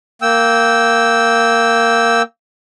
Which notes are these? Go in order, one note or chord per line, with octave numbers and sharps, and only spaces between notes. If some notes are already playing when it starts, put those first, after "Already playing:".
A#3 G5 E6